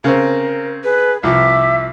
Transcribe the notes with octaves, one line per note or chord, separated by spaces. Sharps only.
C#3 C4 A#4
G#4 B4
C2 F3 E5 D6